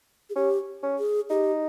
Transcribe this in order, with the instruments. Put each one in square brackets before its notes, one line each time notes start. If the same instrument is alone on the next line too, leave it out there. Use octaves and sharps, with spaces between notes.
[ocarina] G#4
[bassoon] C#4 [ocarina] G4
[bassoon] C#4
[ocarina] G#4
[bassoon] D#4 [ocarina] G4